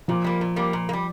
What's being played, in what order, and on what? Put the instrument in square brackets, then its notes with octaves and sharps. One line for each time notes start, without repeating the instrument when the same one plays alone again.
[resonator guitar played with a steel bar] A#2 [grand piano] F3
[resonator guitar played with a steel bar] G3 A#3
A#2
G3 A#3
A#2
A#3
G3